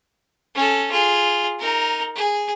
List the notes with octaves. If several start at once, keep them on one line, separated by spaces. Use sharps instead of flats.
C#4 A4
F4 G#4
D#4 A#4
G#4